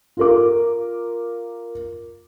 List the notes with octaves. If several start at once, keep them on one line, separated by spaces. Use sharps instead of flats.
F4 A#4 D6